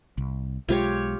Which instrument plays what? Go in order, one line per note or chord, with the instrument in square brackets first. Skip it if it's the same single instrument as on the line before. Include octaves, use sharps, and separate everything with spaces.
[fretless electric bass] C2
[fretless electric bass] B1 G#3 [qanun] F4 G4 C#5